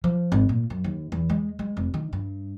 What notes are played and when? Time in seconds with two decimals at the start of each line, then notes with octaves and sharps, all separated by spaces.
0.04 F3
0.32 G#1
0.49 A#2
0.70 F#2
0.84 D#2
1.12 E2
1.29 G#3
1.59 G#3
1.77 F1
1.94 D#3
2.13 G2